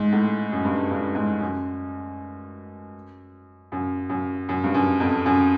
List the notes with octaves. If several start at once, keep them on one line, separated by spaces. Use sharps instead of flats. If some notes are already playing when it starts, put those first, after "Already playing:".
Already playing: G#2
A2
F#2
G2
G2
G#2
F#2
F#2
F#2
F#2
G2
F#2
F2
F#2